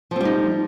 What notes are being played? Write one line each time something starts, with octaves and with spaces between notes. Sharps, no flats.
F3 G3 C4 D#4